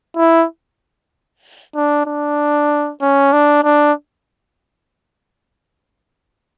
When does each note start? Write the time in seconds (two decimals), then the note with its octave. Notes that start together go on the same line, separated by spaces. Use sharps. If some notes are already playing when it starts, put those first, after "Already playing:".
0.17 E4
1.75 D4
2.06 D4
3.02 C#4
3.32 D4
3.64 D4